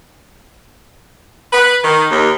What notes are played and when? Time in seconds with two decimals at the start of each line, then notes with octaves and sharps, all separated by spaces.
1.53 B4
1.83 D#3
2.11 D#2